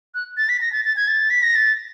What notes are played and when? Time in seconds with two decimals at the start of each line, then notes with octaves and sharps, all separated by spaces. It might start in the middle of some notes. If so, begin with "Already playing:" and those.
0.15 F#6
0.37 A6
0.49 B6
0.61 A#6
0.73 A6
0.85 A6
0.97 G#6
1.08 A6
1.30 B6
1.43 A#6
1.55 A6